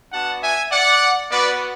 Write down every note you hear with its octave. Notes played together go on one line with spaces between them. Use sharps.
B3 D4 F#4 F#5 A5
E5 G#5
D5 F#5
B3 F#4 B4 D5